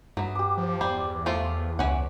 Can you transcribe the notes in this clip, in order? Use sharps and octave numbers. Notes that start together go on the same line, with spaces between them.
G2 F#3 B3
G4 D6
F3
E2 G3 C5
F3 A3 F4
C#2 E3 C#4 F#5